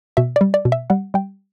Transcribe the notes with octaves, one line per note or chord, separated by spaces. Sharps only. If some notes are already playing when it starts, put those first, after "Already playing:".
B2 E5
D5
G3
D5
B2
E5
G3 F#5
G3 G5